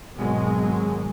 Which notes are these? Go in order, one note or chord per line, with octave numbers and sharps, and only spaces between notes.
G#1 B2 F#3 G#3